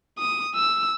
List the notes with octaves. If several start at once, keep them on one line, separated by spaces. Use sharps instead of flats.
D#6
E6